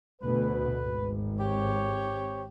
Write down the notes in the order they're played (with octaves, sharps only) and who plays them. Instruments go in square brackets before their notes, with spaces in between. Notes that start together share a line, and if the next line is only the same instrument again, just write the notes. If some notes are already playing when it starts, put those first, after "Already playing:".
[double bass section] D2 B2 [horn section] B4
[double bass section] G#1
[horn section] C4 G4 C#5